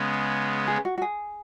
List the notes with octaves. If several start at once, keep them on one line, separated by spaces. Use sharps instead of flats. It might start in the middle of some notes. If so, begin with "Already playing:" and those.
Already playing: C#3 G#3 B3
G#4
F#4
F#4
G#4